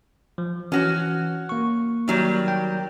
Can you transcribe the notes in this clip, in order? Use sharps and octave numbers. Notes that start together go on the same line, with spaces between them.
F3
E3 C#4 F#4
A#3 C#6
D#3 F#3 G3
G5